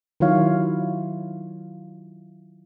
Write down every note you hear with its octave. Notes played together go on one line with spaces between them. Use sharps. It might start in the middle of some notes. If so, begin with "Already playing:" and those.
D#3 F#3 E4 F4 C#5 F5